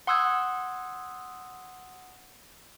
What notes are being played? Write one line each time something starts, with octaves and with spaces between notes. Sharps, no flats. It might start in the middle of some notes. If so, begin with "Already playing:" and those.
F#5 C6 D#6 E6 F#6 G#6